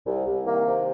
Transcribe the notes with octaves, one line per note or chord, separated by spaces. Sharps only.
C2
C2
D#3 A#3
C3